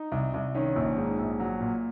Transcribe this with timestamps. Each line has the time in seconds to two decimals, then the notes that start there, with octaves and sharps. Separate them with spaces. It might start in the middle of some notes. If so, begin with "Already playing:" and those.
Already playing: D#4
0.12 C2
0.34 C2
0.55 D#3 C#4
0.76 A#1
0.96 G#2
1.19 A#1
1.40 F#3
1.61 A#2